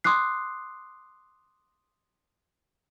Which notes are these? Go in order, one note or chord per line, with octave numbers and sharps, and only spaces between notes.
C6 D6 D#6 F#6 C7